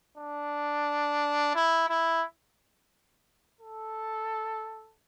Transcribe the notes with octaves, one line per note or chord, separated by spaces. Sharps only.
D4
E4
E4
A4